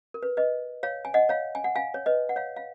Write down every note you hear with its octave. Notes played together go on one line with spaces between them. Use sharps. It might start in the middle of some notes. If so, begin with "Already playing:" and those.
A#4
B4
B4 D#5
C#5 F5
G#5
D#5 F#5
C#5 F5
G#5
F#5
F5 G#5
C#5
B4 D#5
F#5
C#5 F5
F5